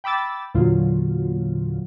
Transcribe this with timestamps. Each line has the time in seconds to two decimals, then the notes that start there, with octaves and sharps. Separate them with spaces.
0.04 G5 B5 D6 E6 A6
0.54 E2 A#2 D3 F#3 F4